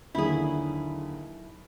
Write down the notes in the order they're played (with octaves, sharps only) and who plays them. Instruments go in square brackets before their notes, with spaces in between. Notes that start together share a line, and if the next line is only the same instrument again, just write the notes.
[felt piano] D#2 D3 F#3 [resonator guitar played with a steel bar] E4 G#4